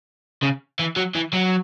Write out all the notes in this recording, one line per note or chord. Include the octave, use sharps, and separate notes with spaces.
C#3
E3
F#3
E3
F#3